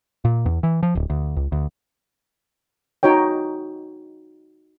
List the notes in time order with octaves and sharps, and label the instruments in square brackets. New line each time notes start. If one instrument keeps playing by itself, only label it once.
[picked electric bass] A#2
E2
E3
F3
D1
D2
C#2
D2
[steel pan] D#4 F#4 C#5 G5